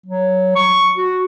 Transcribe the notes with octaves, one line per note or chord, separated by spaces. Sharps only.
F#3
C#6
F#4